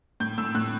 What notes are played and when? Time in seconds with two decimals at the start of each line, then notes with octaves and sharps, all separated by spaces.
0.20 A2 G6
0.38 A2 E6
0.55 A2 F#6